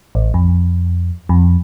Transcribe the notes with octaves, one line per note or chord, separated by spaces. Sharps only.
A1
F2
F2